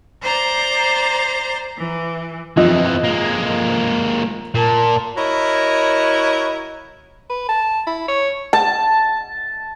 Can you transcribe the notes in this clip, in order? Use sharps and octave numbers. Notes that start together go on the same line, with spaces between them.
C5 D5 A#5 A6
E3
F2 E3 F3 D#5
G#3 A#3
A#2 A#4 A5
E4 F#4 A#4 C#5 D#5
B4
A5
E4
C#5
A5